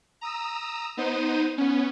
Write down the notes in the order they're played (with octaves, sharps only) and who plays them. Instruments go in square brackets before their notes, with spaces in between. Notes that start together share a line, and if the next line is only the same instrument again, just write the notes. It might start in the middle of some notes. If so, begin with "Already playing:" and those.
[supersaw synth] A#5 D#6 E6
B3 D#4 C5 D#7
B3 C#4